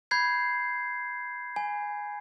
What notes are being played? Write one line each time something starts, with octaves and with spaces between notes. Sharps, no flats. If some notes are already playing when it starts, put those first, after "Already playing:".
B5 G6 G#6 C7
G#5